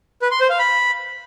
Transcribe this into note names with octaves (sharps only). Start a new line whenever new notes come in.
B4
C6
C5
F5
B5